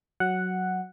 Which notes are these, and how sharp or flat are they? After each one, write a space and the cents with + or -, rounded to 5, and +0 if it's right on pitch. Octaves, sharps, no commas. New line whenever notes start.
F#3 +0 F#5 +0